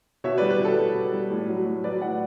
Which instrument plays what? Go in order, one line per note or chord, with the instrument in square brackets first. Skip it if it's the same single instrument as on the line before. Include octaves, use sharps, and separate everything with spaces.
[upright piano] B2 C#5 E5
G3 B4 D5
B4
B2
A4
G3 B4
B2
G3
A2
F#3
A2
F#3 B4 D5
A2 D5 F#5